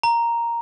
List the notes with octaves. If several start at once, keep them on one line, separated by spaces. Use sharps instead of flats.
A#5